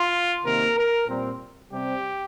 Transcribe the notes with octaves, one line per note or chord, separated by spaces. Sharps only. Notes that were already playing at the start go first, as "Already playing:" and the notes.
Already playing: F4
C3 D#3 A#3 A#4
A#4
A#2 G3 C4
C3 G3 C4 G4